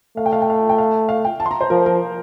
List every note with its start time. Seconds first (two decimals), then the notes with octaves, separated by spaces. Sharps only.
0.17 A3 F5
0.26 G5
0.33 F5
0.42 G5
0.50 F5
0.69 G5
0.78 F5
1.09 F5
1.25 G5
1.40 A5
1.46 C6
1.51 A#5
1.61 C5
1.70 F3 A#4
1.86 A#4